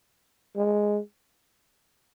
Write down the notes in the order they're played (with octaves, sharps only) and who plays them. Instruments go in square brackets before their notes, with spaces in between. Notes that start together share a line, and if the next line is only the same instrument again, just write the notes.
[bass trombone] G#3